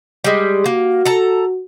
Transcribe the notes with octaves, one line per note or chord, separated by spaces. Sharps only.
G3 G#3
A#3 F#4
A4 A#5